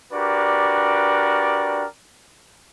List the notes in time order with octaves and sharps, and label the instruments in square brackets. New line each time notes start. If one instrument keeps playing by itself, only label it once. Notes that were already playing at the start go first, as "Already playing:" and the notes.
[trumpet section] D4 F#4 G4 A#4 B4 D5